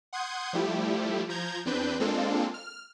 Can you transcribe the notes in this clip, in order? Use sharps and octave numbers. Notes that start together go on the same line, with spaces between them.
F#5 C6 D#6 G6 G#6
F3 G3 A3 E4 G4
F3 A#5 G6 G#6
E2 C4 D4 B4 G6
G#3 A#3 C4 D4 F4 A4
F6